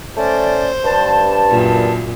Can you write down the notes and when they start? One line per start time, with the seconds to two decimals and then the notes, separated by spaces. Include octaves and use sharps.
0.17 A3 C#4 C5 D5
0.85 G2 A5
1.50 F#2 A#2